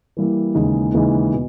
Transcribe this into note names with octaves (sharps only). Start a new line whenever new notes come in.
E3 G3 A#3 E4
D#2 C#3 E3 G#3 D#4
D#2 C#3 E3 G#3 D#4
B2